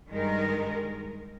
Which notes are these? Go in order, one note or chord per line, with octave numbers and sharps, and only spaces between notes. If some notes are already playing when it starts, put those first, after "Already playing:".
G2 D#3 G#3 D#4 A#4